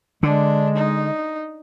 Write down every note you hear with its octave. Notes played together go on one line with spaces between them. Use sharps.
D3 G#3 D4
D#4